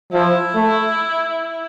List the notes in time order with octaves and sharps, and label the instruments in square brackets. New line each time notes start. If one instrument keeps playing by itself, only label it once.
[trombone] F3 [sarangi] E4
[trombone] A3